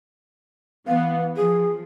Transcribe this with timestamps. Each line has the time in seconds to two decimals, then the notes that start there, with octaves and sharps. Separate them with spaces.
0.87 E3 B3 F5
1.37 F3 G#4